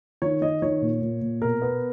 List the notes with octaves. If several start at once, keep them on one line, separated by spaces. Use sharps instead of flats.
D#3 C#5
D#3 D#5
D#3 C#5
A#2
A#2
A#2
B2 A#4
B3